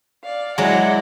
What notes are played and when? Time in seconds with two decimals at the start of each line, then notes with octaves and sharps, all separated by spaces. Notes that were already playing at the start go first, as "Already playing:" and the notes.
0.23 D5 F5
0.58 F#3 G#3 E4 D5 F#5